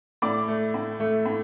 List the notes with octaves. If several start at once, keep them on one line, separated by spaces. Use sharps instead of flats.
A2 D5 D6
A3
A2
A3
A2